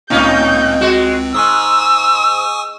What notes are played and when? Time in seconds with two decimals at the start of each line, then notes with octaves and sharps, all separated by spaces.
0.10 C#2 A2 C4 C#4 D#4 G6
0.81 G#3 F#4
1.34 G#2 G#5 C#6 D#6 E6